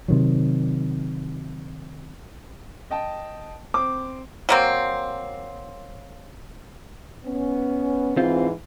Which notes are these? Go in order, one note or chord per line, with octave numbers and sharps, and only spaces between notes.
C3 D#3 F#3
D#5 G5 A5
C4 D6
F#3 A#3 C4
B3 C#4
G#2 E3 C4 F4